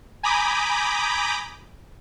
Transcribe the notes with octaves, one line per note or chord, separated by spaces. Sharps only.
G#5 A#5 B5 D6 D#6 G6